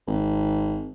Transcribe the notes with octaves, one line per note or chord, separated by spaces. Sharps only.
G#1